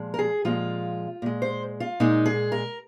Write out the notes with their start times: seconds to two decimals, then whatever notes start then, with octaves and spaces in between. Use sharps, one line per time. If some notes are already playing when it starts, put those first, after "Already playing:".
Already playing: A#2 F3 G#3
0.14 A#4
0.19 G#4
0.45 A#2 F3 G#3 F4
1.22 A#2 G#3
1.42 C5
1.80 F4
2.00 A#2 G#3 D#4
2.26 G#4
2.52 A#4